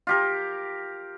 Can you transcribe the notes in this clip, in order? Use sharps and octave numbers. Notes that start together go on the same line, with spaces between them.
F4 G4 A#4